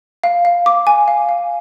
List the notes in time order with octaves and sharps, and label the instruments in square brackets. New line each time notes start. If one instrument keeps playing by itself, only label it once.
[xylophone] F5
F5
D6
G#5
F5
F5